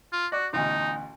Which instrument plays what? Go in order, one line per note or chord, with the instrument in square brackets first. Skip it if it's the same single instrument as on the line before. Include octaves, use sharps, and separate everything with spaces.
[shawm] F4
[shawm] F#4 [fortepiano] D5
[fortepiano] A1 D2 B2 [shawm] D#4